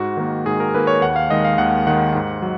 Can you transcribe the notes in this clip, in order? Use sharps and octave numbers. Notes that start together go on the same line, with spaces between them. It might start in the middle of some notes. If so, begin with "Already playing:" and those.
Already playing: G#2 F#4
D#3 A#3
G#2 G#4
A#4
D#3 A#3 B4
C#5
D#2 F#5
F5
D#3 G#3 D#5
F5
D#2 F#5
D#3 G#3 F#5
G#2
F#3